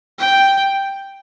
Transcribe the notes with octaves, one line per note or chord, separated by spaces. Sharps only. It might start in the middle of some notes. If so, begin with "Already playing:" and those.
G5